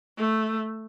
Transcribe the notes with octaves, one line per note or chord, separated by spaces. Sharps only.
A3